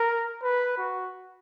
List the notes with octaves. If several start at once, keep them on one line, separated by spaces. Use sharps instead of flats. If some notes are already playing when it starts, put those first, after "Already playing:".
Already playing: A#4
B4
F#4